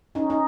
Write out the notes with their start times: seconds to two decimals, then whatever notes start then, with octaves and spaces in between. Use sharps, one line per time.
0.15 C#4 D#4
0.30 D#4